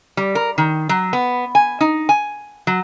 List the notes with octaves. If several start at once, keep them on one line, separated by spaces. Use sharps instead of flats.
G3
A#4
D#3
F#3
B3
G#5
D#4
G#5
F#3